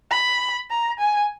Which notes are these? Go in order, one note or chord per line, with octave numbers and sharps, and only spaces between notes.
B5
A#5
G#5